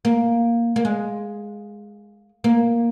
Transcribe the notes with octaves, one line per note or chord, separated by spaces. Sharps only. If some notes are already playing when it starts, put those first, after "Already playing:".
A#3
A#3
G#3
A#3